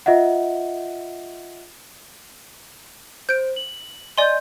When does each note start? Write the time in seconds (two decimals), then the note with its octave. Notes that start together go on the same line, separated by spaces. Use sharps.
0.06 F4 D#5 E5 F#5
3.29 C5 G6 D7
3.56 F#7
4.18 D5 D#5 G#5 C6 G6